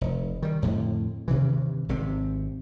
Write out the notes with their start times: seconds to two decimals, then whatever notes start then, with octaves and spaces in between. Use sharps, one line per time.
0.01 F1
0.43 D#3 G3
0.62 F2 A2 D3
1.28 G2 C3 D#3 E3
1.89 G#1 C3 C4